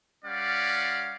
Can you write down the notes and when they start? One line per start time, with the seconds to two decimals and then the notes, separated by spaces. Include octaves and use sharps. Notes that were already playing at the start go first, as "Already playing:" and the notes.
0.25 G3 C#4 D5 F5 F#5